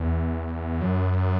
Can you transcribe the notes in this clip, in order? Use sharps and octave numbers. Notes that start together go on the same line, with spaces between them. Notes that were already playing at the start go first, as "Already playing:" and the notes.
Already playing: E2
F#2